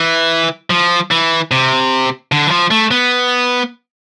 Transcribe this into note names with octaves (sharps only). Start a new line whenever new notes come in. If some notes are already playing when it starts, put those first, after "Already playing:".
Already playing: E3
F3
E3
C3
D3
E3
F3
A3
B3